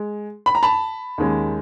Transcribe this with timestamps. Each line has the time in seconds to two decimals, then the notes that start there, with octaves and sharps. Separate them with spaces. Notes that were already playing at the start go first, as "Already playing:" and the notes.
Already playing: G#3
0.46 B5
0.55 A#5
0.63 A5 B5
1.18 D#2 D#3 G#3 C#4